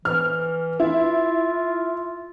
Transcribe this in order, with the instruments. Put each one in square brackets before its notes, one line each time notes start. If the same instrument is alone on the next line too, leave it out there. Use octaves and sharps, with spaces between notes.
[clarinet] E3 [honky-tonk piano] F6
[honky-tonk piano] E4 [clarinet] F4